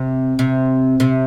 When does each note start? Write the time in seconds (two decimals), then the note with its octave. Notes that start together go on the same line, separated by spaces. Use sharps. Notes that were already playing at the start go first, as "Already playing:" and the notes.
Already playing: C3
0.39 C3
1.00 C3